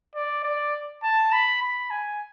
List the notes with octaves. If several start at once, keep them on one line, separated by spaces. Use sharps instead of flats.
D5
D5
A5
B5
B5
G#5